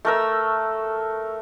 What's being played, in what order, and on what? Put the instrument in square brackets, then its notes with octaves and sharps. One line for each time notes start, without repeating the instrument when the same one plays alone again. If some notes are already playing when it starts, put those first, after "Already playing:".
[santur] A3 A#4 E6